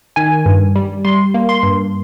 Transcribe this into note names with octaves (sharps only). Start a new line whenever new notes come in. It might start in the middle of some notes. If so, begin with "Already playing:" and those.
D#3 G#5
G2
G3
G3 C6
A#3
C6
G2